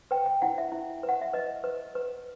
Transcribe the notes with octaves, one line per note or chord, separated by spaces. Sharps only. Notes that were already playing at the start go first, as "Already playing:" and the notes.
B4 G5
G5
E4 F#5
E5
E4
B4
F#5
E5
B4 D#5
B4
B4